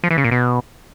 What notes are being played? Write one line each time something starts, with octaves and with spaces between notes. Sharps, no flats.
F3
E3
C#3
A#2
B2